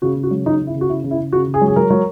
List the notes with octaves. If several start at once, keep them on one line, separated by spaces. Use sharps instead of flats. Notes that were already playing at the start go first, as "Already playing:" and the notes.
C#3 F#4
C#3
F#4
F#3
C#3 D#4
C#3
E4
C#3
F#4
C#3 E4
C#3
E4
C#3
C#3 F#4
C#3
G#4
F#3
G#4
F#3 A#4
F#3